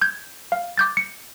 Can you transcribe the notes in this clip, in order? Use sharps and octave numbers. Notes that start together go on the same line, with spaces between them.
G6 G#6
F5
D6 G6 A6
C#7